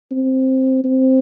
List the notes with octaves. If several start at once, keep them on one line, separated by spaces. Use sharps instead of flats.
C4
C4